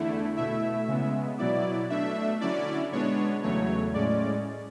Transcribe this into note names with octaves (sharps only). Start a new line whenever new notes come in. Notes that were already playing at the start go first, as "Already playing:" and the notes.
Already playing: E2 D3 A3 E4
B2 A3 E4 E5
C#3 G#3 B3
B2 F#3 B3 E4 D5
B2 A3 D4 E5
D3 F#3 C#4 E4 D5
B2 G#3 B3 D4 C#5
E2 C#3 F#3 A3 C#5
A2 G#3 C#4 D5